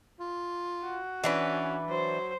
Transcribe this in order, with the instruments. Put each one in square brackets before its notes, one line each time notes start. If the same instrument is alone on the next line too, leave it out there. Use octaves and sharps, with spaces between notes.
[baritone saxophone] F4
[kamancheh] F#4
[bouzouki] E3 D4 B4 [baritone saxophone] C#4
[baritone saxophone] F#3 [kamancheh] C5